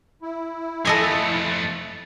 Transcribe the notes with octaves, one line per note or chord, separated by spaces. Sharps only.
E4
F2 A3 A4 D#5 G#5